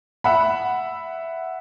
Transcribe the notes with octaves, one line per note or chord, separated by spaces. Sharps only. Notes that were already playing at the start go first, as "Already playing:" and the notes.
E5 F#5 B5